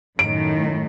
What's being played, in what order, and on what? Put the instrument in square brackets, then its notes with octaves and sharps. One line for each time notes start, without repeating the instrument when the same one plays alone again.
[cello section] F#2 A2 D#3 [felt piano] D7